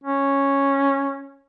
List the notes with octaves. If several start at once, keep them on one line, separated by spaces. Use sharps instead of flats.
C#4